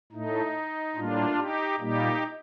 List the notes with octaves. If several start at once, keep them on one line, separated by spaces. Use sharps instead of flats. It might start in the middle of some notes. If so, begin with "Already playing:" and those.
A2 A3 D#4
A2 G3 A#3 D4 F4
D#4 G4
A#2 G3 A#3 D#4 G4